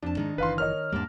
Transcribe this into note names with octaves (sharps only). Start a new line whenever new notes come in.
F2 D4 A5
G#2 D#3 D#4
F#1 E3 B4 F5 C6
A#4 C#5 D#5 F6
E2 G#2 G3 A#3 D4